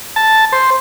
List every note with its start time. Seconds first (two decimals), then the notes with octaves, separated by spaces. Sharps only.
0.16 A5
0.52 C5